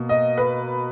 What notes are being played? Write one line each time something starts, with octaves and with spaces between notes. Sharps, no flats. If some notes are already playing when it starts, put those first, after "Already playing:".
Already playing: B2 A#3
D#5
B4